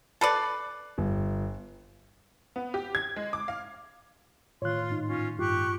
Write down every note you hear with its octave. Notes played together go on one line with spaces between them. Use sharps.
A4 B4 D5 F#6 C7
G1
B3
G4
G#6
G#3
D6
F5
A2 D#3 F4 C#5 C6 F#6
G#2 D#4
C#4 F4
G2 F4 G4 C#6 F#6